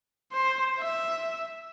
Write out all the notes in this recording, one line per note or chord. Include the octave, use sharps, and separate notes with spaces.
C5
E5